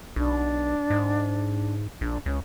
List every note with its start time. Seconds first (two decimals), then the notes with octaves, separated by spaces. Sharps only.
0.16 B1 D4
0.90 G#2
2.01 A#1 D4
2.26 C#2 C#4